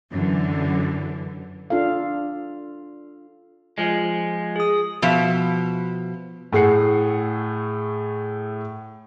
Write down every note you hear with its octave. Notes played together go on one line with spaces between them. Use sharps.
F#2 D3 E3
D4 F4 A4 F5
F3 G#3
G#4 D#6
B2 F3 E5
A2 A3 G#4 F#5 C7 C#7